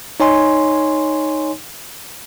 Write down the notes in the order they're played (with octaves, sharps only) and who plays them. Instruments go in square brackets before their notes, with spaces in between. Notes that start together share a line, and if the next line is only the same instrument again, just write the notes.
[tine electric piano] D#4 C#5 G#5 C6